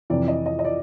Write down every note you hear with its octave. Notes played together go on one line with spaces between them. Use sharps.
F2 C3 E3 D5
D#5
D#5
D#5
D5